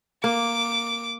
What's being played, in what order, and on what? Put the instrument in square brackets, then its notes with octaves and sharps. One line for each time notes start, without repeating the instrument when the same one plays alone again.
[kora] A#3 [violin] D6